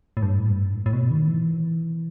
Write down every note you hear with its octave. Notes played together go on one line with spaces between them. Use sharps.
A2
G2
A2
G2
A2
A2
B2
D#3
E3